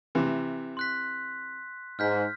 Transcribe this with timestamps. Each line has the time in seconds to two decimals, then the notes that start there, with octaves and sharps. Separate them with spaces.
0.15 C3 E3
0.77 C6 F#6 B6
1.99 G#2 F6 G6 B6